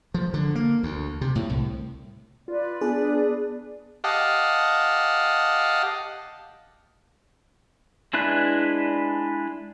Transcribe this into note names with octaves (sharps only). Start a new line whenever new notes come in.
F3
D3
A#3
D2
C3
A2
C2
F4 B4 D5
B3 D4 G#4
G4 D#5 F5 F#5 A5
G#3 D4 E4 B4 F#6